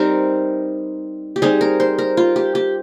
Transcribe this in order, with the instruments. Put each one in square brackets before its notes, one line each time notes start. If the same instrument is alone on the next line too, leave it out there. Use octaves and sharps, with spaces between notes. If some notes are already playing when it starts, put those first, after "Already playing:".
Already playing: [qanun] G3 C4 D#4 A#4
G4
G3 C4 D#4 G#4
A#4
C5
A#4
F4
G4
G4